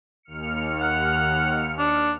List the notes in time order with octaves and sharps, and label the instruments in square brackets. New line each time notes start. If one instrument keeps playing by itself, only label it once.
[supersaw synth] D#2 F6 C#7
[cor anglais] F#5
D4